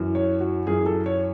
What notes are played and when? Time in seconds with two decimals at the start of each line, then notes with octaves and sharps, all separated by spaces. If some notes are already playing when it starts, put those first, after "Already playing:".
Already playing: F#2 E3
0.15 C#5
0.40 F#4
0.67 F#2 E3 G#4
0.86 A4
1.06 C#5